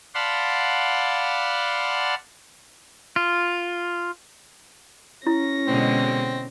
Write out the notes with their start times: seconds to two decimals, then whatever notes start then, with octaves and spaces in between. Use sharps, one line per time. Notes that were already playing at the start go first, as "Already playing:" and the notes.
0.14 D5 F5 F#5 A5 B5 C6
3.16 F4
5.27 C#4 E4 A#6
5.67 B2 D3 G#3 C4